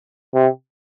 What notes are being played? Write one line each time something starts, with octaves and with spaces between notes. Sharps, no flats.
C3